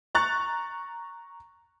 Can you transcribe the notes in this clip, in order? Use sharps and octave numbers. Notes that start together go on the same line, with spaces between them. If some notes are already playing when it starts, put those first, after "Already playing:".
A#5 C#6 F#6 A6